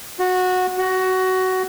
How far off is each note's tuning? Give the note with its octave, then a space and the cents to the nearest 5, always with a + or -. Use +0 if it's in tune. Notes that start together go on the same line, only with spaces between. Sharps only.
F#4 -15
F#4 +15